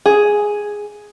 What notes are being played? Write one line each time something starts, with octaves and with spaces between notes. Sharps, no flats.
G#4